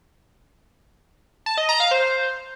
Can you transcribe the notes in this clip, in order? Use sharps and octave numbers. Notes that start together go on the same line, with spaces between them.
A5
D#5
A#5
F5
C5